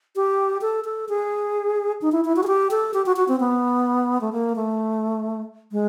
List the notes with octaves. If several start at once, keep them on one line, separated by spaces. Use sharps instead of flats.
G4
A4
A4
G#4
D#4
E4
E4
F#4
G#4
G4
A4
G4
F#4
F#4
C4
B3
A3
A#3
A3
G#3